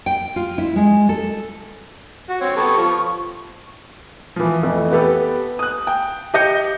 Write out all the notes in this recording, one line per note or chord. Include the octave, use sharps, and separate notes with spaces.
G5
F4
E4
G#3
A4
F#4
C4 C#5
B3 G4 A4 C#6
F3
E3 F3
F2 E3 A3
B3 G4 A4 B4
D#6 F#6
G5
G4 D#5 G6 C#7